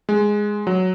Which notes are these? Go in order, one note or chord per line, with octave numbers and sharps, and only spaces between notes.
G#3
F#3